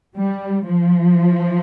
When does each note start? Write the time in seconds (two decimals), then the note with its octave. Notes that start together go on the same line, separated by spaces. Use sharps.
0.16 G3
0.66 F3